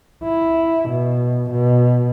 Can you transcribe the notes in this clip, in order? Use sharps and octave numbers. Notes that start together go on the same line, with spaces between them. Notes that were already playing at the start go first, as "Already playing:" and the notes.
E4
B2
B2